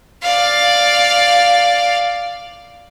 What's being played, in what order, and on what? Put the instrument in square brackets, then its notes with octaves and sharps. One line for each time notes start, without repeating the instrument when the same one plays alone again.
[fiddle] D5 F5